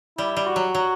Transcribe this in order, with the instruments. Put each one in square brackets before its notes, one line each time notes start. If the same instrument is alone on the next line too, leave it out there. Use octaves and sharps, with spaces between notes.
[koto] G3 [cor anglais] E4
[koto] G3
[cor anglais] F#4
[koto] F#3
F#3